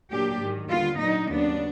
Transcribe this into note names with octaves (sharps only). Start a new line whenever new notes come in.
A#2 F#3 A#3 D4 G4
G#2 D#3 F#3
D#2 D3 G3 B3 F4
A#2 F#3 B3 D4 D#4
D#2 C#3 F#3 B3 D4